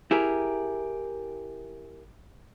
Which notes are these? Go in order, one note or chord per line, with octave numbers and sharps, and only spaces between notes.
E4 G4 G#4 A#4